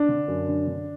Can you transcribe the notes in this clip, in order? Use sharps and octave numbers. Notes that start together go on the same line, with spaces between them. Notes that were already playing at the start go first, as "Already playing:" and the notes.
Already playing: D4
D3
F#2
D3
D3